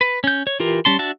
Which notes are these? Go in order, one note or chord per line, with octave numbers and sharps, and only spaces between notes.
B4
C#4 G6
C#5
E3 F4 G4 A#4
G3 C#4 A5 C6
D4 F#4 E5 A5